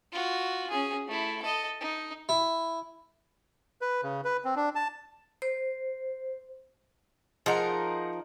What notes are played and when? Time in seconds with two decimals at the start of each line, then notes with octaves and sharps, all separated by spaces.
0.12 F4 F#4
0.70 C#4 G#4
1.08 A3 E4
1.42 A4 D#5
1.81 D#4
2.29 E4
3.81 B4
4.03 C#3
4.25 B4
4.45 C4
4.56 D4
4.75 A5
5.42 C5
7.46 F3 D#4 G#4 A#4 C5 F#5